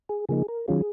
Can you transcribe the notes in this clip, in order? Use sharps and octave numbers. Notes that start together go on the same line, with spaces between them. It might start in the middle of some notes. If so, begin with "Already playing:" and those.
G#4
C#3 F3 A#3 D#4 G#4
A#4
D#3 F#3 C#4 F4 G#4